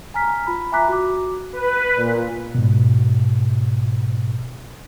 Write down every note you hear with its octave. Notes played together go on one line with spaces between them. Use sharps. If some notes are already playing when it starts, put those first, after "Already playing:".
G#5 A#5 F6 B6
F4 B5
E5 G#5 A#5 D6 F#6 B6
F#4 D6
B4
A#2
G#2 B2